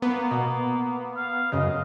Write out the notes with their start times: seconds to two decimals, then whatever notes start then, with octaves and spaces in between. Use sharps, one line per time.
0.02 A#3 B3
0.31 B2
1.17 F5
1.52 F#2 C#3 D#5